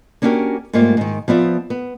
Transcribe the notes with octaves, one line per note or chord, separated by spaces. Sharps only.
A#3 C#4 D4 F#4 G4 A#4
G#2 G3 A3 A#3 F4
G#2 D#3
F3 B3 D5 E5
B3